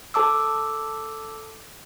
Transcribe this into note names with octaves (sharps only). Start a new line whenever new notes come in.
A4 A5 D6 E6